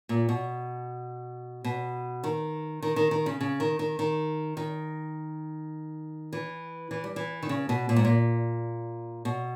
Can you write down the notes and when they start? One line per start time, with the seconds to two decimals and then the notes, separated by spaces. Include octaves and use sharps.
0.09 A#2
0.29 B2
1.64 B2
2.24 D#3
2.82 D#3
2.96 D#3
3.11 D#3
3.26 C#3
3.41 C#3
3.60 D#3
3.79 D#3
3.99 D#3
4.57 D#3
6.33 E3
6.91 E3
7.04 G3
7.16 E3
7.43 D#3
7.49 C#3
7.69 B2
7.89 A#2
7.96 G#2
8.05 A#2
9.25 B2